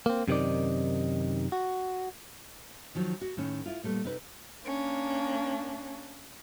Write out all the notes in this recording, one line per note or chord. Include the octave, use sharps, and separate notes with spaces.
A#3 C4
F#2 C3 D#3 D#4 D5
F#4
D#3 F3 F#3
F#4
A2 D#3 C#4
E4 F4
A#2 G3 A3 B3
C3 D#4 B4
A#3 C#4 D4